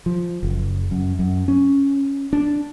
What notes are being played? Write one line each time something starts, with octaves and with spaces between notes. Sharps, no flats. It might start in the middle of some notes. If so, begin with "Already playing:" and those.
F3
F#1
F#2
F#2
C#4
D4